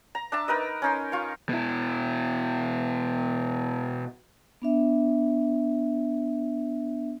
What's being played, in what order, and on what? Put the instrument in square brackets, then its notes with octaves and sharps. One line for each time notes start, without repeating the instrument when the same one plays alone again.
[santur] A#5
D4 E5 A5
D#4 A#4 B4 D#5
C#4 D#4 C6
F4 F5 C#6
[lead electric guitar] B2 E4
[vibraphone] B3 D4 E5